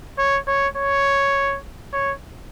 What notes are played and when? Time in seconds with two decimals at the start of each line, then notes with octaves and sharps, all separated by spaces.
0.18 C#5
0.47 C#5
0.77 C#5
1.93 C#5